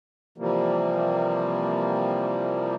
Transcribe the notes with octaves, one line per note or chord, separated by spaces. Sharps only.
C3 E3 F3 G3 A#3